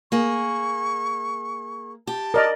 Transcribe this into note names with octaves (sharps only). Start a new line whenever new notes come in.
A#3 G#4 C#6
G4 A5
A#4 D5 D#5